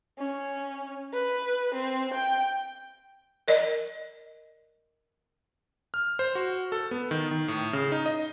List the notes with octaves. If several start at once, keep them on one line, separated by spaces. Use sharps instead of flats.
C#4
B4
C4
G5
A#4 D5 D#5
F6
C5
F#4
A4
B3
D#3
D#3
A2
C#3
D#4
D#5